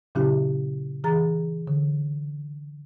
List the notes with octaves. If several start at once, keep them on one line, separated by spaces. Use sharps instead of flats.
A#2 C#3 F#3 C#4 E4 G4
E3 G#4 A#5 A6
D3